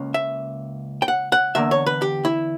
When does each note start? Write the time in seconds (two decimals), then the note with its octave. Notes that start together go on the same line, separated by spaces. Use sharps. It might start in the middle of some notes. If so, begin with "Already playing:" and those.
Already playing: C#2 A#3 C#4
0.14 E5
1.02 G5
1.08 F#5
1.32 F#5
1.55 E2 D3 A#3 E5
1.71 C#5
1.86 B4
2.02 G4
2.25 E4